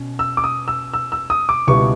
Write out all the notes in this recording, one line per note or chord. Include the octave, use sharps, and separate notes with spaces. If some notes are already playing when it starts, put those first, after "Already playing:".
Already playing: B2 C#4
E6
D6
D#6
E6
E6
E6
D#6
D6
C#2 B2 G3 B3 E4 C#6